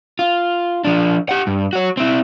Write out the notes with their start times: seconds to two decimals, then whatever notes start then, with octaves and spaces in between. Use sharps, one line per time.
0.19 F4
0.84 F3 D4
1.29 G4 F#5
1.47 G2
1.73 F#4 C#5
1.97 C4 E4